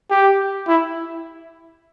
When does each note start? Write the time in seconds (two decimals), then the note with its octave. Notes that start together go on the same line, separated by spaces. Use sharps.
0.11 G4
0.68 E4